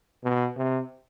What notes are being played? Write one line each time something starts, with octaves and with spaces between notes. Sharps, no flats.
B2
C3